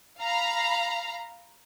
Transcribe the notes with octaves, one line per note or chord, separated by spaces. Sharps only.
F5 A#5 B5